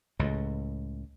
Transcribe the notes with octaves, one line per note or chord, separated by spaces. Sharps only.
C#2 A2